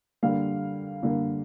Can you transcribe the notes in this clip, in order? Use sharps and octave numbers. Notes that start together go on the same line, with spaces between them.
D3 G3 A#3 F5
D3 G3 A#3